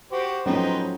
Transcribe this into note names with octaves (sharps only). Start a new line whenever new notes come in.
F#4 G4 C5
A2 F3 F#3 C#4 D#4 A4 B4 G5